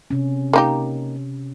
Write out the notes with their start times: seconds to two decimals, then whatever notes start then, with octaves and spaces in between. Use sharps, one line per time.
0.11 C3 C#4
0.53 A#3 D#4 G4